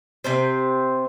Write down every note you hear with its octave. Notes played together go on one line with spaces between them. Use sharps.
C3 C4 C5